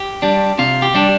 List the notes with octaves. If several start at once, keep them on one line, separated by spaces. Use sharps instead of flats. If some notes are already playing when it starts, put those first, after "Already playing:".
Already playing: G4
G3 D4
C3 F4
G4
G3 D4